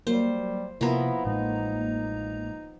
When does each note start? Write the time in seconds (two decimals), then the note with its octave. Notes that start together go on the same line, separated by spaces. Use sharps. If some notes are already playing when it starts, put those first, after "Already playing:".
0.07 F#3 G3 A#3 C5
0.81 C3 F3 A#3 B3 E4 A#5
1.25 A1 A2 G#3 D#4